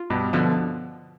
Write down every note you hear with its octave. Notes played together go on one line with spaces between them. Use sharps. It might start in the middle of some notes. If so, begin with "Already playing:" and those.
Already playing: F4
G2 B2
B2 D3 F3